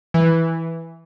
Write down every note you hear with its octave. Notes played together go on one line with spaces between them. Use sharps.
E3